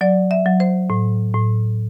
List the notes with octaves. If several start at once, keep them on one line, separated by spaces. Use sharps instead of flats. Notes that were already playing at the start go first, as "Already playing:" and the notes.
F#3 D5
E5
F#3
C5
A2
A2